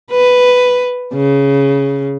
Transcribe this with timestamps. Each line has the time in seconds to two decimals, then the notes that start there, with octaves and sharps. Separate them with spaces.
0.11 B4
1.14 C#3